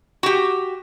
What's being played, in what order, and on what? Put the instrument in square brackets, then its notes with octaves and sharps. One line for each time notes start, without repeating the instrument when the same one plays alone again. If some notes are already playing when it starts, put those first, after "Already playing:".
[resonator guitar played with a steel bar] F#4 G4